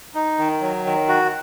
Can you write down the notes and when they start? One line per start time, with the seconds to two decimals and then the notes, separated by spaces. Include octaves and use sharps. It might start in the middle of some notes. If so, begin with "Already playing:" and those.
0.15 D#4
0.39 D#3
0.61 F#3
0.86 D#3
1.08 F#4